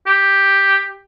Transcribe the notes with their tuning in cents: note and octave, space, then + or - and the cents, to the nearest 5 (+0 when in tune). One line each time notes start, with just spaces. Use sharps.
G4 +5